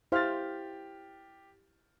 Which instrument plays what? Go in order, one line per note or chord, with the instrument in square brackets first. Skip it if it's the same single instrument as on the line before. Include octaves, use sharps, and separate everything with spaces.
[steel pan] E4 C5 F5 [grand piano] G4 F6 A6